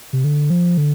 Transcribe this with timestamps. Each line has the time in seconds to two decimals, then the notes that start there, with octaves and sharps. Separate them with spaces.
0.13 C3
0.24 D3
0.50 F3
0.77 D3